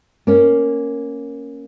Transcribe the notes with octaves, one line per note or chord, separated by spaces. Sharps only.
A#3 C#4